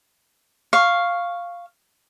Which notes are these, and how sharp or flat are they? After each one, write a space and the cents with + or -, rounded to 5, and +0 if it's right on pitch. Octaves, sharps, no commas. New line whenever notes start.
F5 +0 C#6 +0